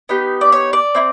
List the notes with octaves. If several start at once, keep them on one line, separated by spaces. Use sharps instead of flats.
B3 D#4 G4
D5
C#5
D5
C4 E4